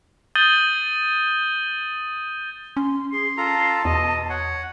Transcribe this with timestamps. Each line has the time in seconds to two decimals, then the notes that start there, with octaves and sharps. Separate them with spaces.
0.35 D#6 G6 A6 D#7 F#7 G7
2.77 C#4 C6
3.12 G#4 C6
3.37 F4 A4 A5 A#5
3.85 E2 B2 D#5
4.30 C#5 F#5